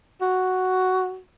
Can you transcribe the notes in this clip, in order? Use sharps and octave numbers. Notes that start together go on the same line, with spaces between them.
F#4